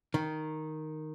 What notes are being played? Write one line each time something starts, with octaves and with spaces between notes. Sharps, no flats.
D#3